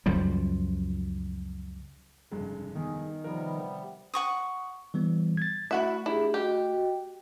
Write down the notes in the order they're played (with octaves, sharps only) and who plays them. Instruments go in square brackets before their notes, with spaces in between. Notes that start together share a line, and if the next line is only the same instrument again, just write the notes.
[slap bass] C#2 F#2 F3 G3
[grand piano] F1 G2 G#3 [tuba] C#3
[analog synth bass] D#3 [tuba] B3 [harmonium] G#4
[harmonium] C3 G3 B3 [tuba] F3 [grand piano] F4 A#4
[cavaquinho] F#5 C#6 D#6
[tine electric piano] E3 G3 B3
G#6 A6
[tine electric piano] A3 [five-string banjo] E4 F#4 E5
[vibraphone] D4 G4 G#4 [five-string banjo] E4
[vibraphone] F#4 D#5 G5 [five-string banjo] G4